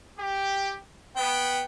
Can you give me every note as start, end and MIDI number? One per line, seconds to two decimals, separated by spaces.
0.18 0.78 67
1.16 1.62 59
1.16 1.63 79